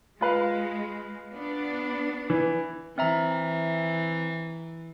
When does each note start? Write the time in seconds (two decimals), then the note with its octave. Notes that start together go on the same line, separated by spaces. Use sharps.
0.21 G#3 F4 B4 F5
1.32 B3 D4
2.30 E3
2.98 E3 C4 E5 A#5